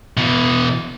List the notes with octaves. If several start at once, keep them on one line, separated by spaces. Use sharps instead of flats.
B2 E3